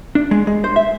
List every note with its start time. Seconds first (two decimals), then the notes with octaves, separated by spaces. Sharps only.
0.15 D4
0.31 G#3
0.47 G#3
0.64 C5
0.76 E5